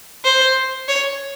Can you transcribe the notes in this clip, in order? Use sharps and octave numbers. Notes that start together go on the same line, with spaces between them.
C5
C#5